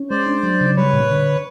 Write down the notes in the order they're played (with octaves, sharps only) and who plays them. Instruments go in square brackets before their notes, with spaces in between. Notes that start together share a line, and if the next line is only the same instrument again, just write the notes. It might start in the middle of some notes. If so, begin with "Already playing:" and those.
Already playing: [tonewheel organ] C#4
[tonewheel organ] G#3 [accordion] C5 D5
[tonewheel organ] D4
F#3
C#3
[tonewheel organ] G3 [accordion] B4 C#5
[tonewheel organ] A#2
D3